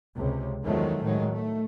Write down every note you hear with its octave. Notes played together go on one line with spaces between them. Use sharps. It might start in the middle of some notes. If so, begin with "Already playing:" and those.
C#2 C3
E2 D#3 F3 F#3 G#3 A3
A2 D#3 F#3 G#3
A3